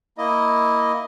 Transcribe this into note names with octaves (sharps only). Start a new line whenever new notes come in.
A#3 E4 D#5